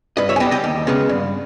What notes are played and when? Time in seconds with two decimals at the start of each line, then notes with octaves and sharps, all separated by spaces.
0.17 G2 B4 D#5
0.29 C#5 E5
0.36 G#5
0.40 G3 B3 D#5 G5
0.51 D#5 G5
0.64 D#2
0.87 C#3 G#3 B3
1.09 G2